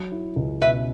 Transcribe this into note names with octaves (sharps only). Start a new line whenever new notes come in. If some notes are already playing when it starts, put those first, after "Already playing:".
Already playing: F#3
E4
C#2
B2 B4 E5